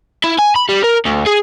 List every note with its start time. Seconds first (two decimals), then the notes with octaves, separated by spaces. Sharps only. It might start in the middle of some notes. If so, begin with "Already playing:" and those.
0.24 E4
0.39 G#5
0.56 B5
0.69 G3
0.84 A#4
1.06 D2
1.27 G#4